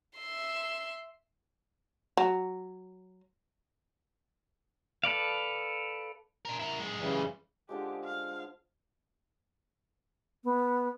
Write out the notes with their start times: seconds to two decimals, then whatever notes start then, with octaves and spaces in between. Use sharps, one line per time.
0.16 E5 C6
2.17 F#3
5.04 A4 B4 D5 F5
6.45 D4 A#4
6.60 E4 A#4
6.79 F#2 G#3
6.99 C#3 E3 G3
7.69 D3 F3 G#3 G4
8.04 F5
10.44 B3